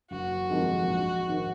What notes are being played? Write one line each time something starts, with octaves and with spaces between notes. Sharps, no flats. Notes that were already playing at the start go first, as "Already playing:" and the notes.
F#1 F#4
F2 D#3 G#3
A#1
G#2 D#3